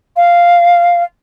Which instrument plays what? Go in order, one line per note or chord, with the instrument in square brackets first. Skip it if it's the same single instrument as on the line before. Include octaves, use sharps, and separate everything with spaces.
[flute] F5